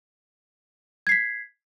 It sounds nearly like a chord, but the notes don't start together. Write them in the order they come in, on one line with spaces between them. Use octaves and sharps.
G#6 C7 B6